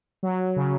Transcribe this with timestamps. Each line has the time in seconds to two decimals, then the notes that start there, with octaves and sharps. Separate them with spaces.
0.23 F#3
0.56 C#3